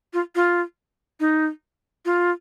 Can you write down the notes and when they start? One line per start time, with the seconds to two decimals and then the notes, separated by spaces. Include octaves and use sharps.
0.13 F4
0.35 F4
1.20 D#4
2.05 F4